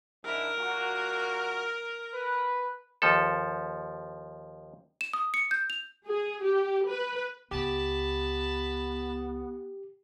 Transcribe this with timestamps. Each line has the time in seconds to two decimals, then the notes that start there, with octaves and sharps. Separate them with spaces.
0.24 G#2 D4 E4 A#4
0.57 A#2 F#4
2.12 B4
3.02 D#2 F3 A4
5.01 E7
5.13 D#6
5.34 C#7
5.51 G6
5.70 F7
6.06 G#4
6.43 G4
6.87 B4
7.51 C#2 B3 G4 A5 B5